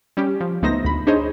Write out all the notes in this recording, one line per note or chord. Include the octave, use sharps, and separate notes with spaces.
G3 C#4 G4
F3
C#2 A3 B3 D#4 C5 A#6
D2 B5
D4 D#4 G#4 C5 C#5 D#5